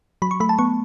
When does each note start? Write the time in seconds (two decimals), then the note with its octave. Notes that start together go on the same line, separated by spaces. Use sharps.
0.22 F#3 B5
0.31 C#6
0.40 A3 B5
0.49 A5
0.59 B3 C#6